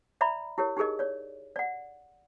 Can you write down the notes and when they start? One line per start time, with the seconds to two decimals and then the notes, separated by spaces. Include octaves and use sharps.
0.21 D5 E5 A#5 B5
0.58 E4 G4 A#4 C#5
0.77 D#4 G4 G#4 A#4 D#5
0.99 C#5 D5
1.56 D5 F#5